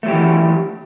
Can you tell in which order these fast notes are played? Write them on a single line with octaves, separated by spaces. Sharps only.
A3 F#3 G4 E3